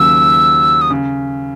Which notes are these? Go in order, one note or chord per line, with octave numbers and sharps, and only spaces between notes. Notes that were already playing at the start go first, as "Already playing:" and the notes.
Already playing: D#2 C#3 F#3 E6
D#6
C#3